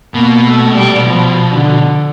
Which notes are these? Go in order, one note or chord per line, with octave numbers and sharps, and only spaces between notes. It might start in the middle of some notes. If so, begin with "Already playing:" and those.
B2 A#3
A3
G3
F3
D3